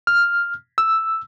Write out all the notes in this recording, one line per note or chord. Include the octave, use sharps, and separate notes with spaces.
F6
E6